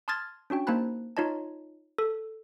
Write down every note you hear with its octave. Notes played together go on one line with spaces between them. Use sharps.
A5 C6 D#6 F6 G#6 A6
C#4 D4 F#4 G5
A#3 D#4 C5 A5 B5 F#6
D#4 F4 C#5 D#5 A5
A4